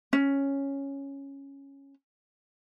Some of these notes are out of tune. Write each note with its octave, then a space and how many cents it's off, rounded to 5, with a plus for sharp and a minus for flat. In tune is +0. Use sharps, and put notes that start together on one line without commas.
C#4 -5